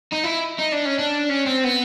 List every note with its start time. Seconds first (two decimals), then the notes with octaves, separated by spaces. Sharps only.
0.12 D#4
0.24 E4
0.58 D#4
0.72 D4
0.85 C#4
0.99 D4
1.29 C#4
1.46 C4
1.65 B3